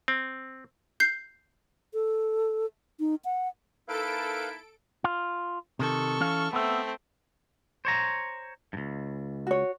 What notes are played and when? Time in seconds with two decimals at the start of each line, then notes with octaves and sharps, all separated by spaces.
0.08 C4
1.00 G6 C7
1.93 A4
3.00 D#4
3.25 F#5
3.88 A#3 D#4 E4 A4 B4 F5 D7
5.04 F4
5.79 C3 D#3 A4 C#6
6.20 E3 C#4 F5
6.53 A3 B3 C4 E5
7.85 C5 C#5 A#5
8.73 C#2 G2
9.47 F#4 C#5